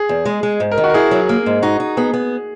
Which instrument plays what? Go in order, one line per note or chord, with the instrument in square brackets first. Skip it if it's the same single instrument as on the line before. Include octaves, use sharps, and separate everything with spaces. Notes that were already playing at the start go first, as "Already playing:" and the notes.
Already playing: [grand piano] G#4
[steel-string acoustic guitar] E2
G#3
G#3
G#2
[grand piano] A#4
[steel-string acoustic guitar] D#3
[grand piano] F#4
A#4
[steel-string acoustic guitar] E4 [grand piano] G#4
[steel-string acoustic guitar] F#3
A#3
G#2
[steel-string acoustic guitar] D#4 [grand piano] F#4
[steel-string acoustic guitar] D#4
[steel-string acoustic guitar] B3 [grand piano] G#4
[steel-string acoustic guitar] B3